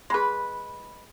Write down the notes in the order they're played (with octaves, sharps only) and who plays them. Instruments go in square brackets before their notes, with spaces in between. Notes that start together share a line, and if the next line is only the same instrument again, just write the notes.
[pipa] G#3 B4 [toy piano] G#4 B5 C6